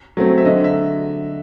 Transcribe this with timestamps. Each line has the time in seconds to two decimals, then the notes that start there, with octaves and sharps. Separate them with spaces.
0.17 F#3 A3 C4
0.38 E5
0.45 D3 D#5
0.64 E5